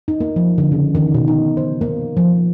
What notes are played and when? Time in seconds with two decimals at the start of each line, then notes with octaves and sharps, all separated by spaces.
0.08 D#4
0.20 A#3
0.36 F3
0.58 D3
0.72 C#3
0.95 D#3
1.14 B2
1.28 D#4
1.57 C5
1.81 A#3
2.17 F3